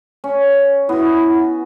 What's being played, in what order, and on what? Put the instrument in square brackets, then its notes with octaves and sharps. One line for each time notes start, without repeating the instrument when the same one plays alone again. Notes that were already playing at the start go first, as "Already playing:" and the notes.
[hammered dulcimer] C#4
[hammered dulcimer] B3 F#4 [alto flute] E4